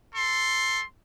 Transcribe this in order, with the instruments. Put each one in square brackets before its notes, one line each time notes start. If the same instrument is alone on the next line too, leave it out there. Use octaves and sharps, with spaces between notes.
[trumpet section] A4 C6